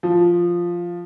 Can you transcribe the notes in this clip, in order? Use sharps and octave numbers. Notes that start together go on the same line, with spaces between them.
F3